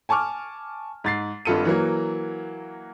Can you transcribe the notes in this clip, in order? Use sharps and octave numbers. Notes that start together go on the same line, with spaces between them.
G#5 A5 C#6 D6 F6
G#2 A6 C7
G#1 G2 F4 A4 C#7 D#7
E3 F#3 A#3